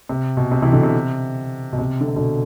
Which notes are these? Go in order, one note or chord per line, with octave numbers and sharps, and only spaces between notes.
C3
B2
C3
C3 E3
B2 D3
C3
B2
C3
D3
C3
B2 D3